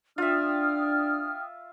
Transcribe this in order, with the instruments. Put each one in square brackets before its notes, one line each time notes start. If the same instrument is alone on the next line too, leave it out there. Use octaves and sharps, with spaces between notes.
[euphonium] D4 [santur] F4 E5 [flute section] G5 D#6 F6